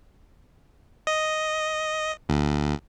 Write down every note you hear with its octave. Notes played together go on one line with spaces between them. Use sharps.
D#5
D2